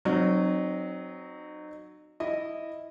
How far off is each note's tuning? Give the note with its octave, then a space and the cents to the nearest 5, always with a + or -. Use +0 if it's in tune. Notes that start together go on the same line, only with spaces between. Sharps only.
F#3 +0 C4 +0 D#4 -35
E4 -10 D#5 -15